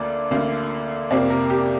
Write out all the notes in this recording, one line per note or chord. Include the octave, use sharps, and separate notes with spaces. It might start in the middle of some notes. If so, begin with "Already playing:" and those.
Already playing: D2 D3 A#3 D5
D2 D3 A#3
F2 C3 A#3 D5
A#4
G4